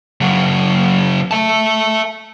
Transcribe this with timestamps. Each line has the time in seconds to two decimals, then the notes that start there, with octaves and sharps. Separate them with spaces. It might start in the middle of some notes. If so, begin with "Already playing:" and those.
0.21 C#3 F#3
1.31 E5 A5